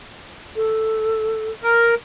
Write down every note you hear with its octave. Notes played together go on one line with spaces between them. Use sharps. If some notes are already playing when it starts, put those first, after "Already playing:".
A4
A#4